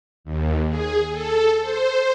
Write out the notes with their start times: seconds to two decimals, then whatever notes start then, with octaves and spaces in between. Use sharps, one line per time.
0.24 D#2
0.69 G#4
1.12 A4
1.61 C5